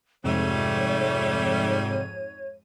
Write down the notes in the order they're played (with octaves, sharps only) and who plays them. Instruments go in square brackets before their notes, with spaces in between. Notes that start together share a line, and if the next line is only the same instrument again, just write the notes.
[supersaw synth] F2 G#2 D#7 [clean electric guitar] C3 [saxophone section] G3 A3 [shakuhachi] C#5